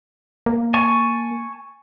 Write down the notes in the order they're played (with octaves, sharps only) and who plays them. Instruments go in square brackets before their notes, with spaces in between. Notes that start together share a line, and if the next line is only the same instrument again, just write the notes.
[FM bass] A#3
[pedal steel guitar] G#5 A5 C#6